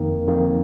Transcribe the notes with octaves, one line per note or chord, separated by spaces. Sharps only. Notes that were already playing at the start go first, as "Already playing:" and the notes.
Already playing: F2 D#3 A#3
F2 D#3 A#3